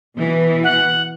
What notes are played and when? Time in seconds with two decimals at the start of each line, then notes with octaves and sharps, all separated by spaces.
0.17 B2 E3
0.64 F#5